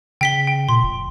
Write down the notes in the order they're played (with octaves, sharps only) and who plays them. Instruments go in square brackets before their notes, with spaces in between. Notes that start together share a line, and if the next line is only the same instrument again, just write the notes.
[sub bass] C#3 [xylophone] G5 B6 G7
[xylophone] G5
[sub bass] A#2 [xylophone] C6
[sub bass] F1